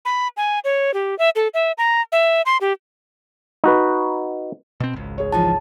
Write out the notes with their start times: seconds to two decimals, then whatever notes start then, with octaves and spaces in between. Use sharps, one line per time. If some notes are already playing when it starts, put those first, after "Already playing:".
0.05 B5
0.37 G#5
0.64 C#5
0.94 G4
1.19 E5
1.36 A4
1.54 E5
1.78 A#5
2.12 E5
2.46 C6
2.61 G4
3.64 D#4 F#4 B4
4.80 B2 C4
4.93 G#1 C#2
5.18 G#4 C#5
5.32 E3 F3 D#4 A5